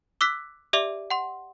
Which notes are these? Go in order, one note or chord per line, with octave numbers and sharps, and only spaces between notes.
D6 E6 F#6 B6
G4 D5 E5 D6 F7
F#5 C6